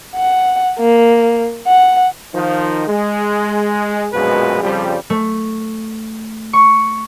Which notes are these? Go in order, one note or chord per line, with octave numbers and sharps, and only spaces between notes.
F#5
A#3
F#5
D#3 F3 D#4
G#3
A#1 F#2 B2 F3 G#3 B4
F2 C#3 F3 G3
A3
C#6